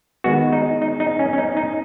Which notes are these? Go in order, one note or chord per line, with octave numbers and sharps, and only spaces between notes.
D#3 G#3 B3 F#4
D#4
D#4
D#4
C#4
C#4
D#4
D#4